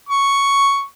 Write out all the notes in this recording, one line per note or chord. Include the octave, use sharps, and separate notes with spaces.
C#6